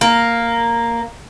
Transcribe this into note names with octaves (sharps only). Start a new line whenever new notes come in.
A#3